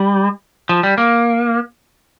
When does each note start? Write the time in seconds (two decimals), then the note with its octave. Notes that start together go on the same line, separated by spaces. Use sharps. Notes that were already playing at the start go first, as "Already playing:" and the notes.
Already playing: G3
0.69 F3
0.83 G3
0.98 A#3